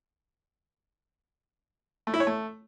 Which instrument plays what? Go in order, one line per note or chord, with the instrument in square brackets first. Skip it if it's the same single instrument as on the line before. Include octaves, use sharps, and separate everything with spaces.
[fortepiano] A3
E4
C#5
A3